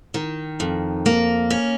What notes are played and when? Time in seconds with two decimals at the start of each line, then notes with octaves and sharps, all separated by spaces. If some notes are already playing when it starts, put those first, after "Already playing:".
0.14 D#3
0.60 F2
1.06 A#3
1.50 C#4